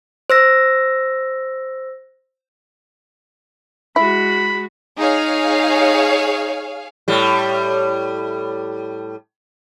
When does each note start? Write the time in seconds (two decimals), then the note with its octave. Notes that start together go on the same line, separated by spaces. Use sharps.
0.30 C5 E6 A#6
3.96 G#3 E4 F#4 B5
4.98 D#4 G#4 C#5 F5
7.08 A2 G3